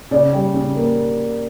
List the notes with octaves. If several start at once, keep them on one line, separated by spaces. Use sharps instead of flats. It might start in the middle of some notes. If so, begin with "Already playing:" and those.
C#3 D5
G3
C#3
A#3